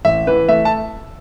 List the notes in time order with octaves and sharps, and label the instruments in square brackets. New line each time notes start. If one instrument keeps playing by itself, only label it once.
[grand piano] A1 E5
E3 B4
A3 E5
A5